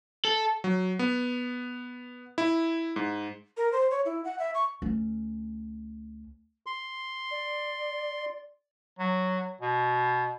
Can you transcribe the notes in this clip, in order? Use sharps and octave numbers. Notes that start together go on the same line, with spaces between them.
A4
F#3
B3
E4
G#2
A#4
C5
C#5
E4
F#5
E5
C#6
D2 C#4
C6
D5
F#3
B2